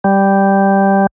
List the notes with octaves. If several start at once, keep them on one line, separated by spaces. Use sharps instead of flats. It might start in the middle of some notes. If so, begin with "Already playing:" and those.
G3